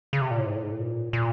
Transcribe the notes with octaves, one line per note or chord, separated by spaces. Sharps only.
C#3
C3
A#2
A2
G#2
A2
G#2
A2
A#2
A#2